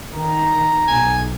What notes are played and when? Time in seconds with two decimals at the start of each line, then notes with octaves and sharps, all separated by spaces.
0.14 D#3 A#5
0.88 B1 G#5